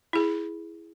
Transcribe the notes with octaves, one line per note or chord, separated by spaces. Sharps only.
E4 G#4